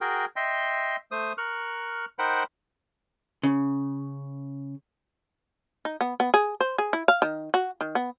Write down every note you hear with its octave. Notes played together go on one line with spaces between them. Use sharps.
F#4 G#4 A#4 G5
D#5 E5 G5 C6
A3 C5 D#6
A#4 C#6 F6 F#6
D#4 A#4 C5 F#5 G5 B5
C#3
D#4
B3
B3
G#4
C5
G#4
E4
F5
D#3
F#4
D#3
B3